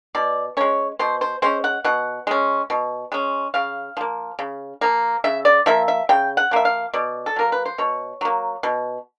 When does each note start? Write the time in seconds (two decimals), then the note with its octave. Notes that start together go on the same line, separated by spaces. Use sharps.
0.15 B2 D5
0.57 G#3 C#4 C#5
0.99 B2 C5
1.21 C5
1.42 G#3 C#4 C5
1.64 F#5
1.85 B2 F#5
2.27 G#3 C#4
2.70 B2
3.12 G#3 C#4
3.54 C#3 F5
3.97 F3 A#3
4.39 C#3
4.81 F3 A#3
5.24 C#3 E5
5.45 D5
5.66 F3 A#3 E5
5.88 E5
6.09 C#3 G5
6.37 F#5
6.51 F3 A#3 E5
6.65 F5
6.94 B2 D5
7.26 A4
7.36 F#3 A#3 A#4
7.52 B4
7.65 C5
7.78 B2 C#5
8.21 F#3 A#3
8.63 B2